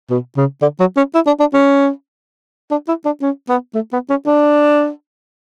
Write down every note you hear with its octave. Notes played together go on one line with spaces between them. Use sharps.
B2
C#3
D3
F#3
C#4
E4
D4
D4
C#4
D4
E4
D4
C#4
B3
A3
B3
C#4
D4